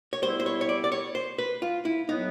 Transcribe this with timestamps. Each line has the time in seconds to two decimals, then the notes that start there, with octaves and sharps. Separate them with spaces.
0.13 C#5
0.22 G3 B3 E4 C5
0.40 C5
0.46 C#5
0.61 C#5
0.69 D5
0.84 D5
0.92 C#5
1.15 C5
1.38 B4
1.62 F4
1.85 E4
2.09 A2 F#3 B3 D#4